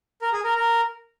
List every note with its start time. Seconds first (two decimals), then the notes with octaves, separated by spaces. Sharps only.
0.22 A#4
0.33 G#4
0.44 A#4
0.55 A#4